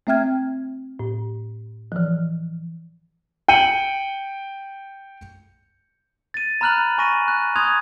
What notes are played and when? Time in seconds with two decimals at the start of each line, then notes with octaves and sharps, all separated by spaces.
0.07 A3 C4 E5 G5 F6 G#6
0.99 A2
1.92 E3 F3
3.48 G5 G6 C#7 D#7 F#7
6.34 A6 D#7
6.61 A#5 B5 F6 F#6 F7 F#7
6.98 G#5 C#6 A#6 D#7
7.28 F#6
7.56 C6 D#6 F#6 G#6 F7